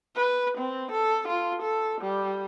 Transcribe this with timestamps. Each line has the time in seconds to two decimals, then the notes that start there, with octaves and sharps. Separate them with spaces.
0.16 B4
0.58 C4
0.92 A4
1.28 F4
1.62 A4
2.01 G3